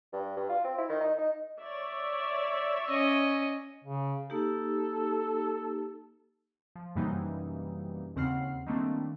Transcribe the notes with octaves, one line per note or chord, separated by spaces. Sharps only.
G2
G2
F4
C4
E4
D#3
D#4
D#4
C#5 D5 E5
C#4 D#5
C#3
A#3 D#4 G4 A4
F3
F#2 C3 E3 G3 A#3 D#4
D#2 C#3 C4 F#5 F6 C7
D#3 G3 A3 A#3 C4 D4